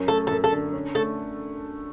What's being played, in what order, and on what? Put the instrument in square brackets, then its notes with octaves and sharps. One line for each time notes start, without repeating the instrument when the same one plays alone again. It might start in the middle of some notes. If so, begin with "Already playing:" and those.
Already playing: [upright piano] F#2 C#4
[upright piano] A3 [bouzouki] A4
[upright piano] F#2 [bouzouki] A4
[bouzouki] A4
[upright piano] D3
C#4
[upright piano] A3 [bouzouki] A4